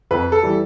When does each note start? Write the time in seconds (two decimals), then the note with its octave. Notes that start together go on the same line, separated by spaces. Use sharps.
0.11 F2 B4
0.32 A4
0.43 E3 G3